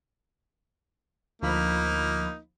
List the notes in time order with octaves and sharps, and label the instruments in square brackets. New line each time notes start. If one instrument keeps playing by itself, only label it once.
[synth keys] D2 F3 B5 [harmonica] A#3 D#4